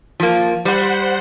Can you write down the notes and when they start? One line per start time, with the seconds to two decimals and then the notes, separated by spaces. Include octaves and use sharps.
0.20 F3 A#3
0.65 G3 C5 F#5